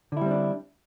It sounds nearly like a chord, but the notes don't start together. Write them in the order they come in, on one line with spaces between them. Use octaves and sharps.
D3 E4 G3 C4 D4